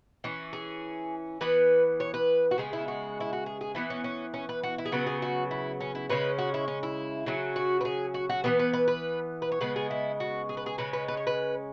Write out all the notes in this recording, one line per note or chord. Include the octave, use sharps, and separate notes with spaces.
E3 C#4
G#4
E3 B3 B4
C#5
B4
F#4
C#3 G#3 B3 G#4
E4
F#4
E4
F#4
G#4
G#4
E3 B3 E4
C#4
C#4
C#4
B4
F#4
E4
G#4
C#3 F#3 B3 B4
G#4
F#4
E4
C#4
E4
C#3 G#3 C#4 B4
F#4
E4
C#4
E4
C#3 F#3 C#4
F#4
B4
G#4
F#4
F#4
E3 G#3 B3 B4
B4
B4
B4
B4
C#5
C#3 G#3 B3 B4
G#4
E4
F#4
G#4
B4
G#4
C#3 G#3 C#4 B4
B4
B4
C#5
B4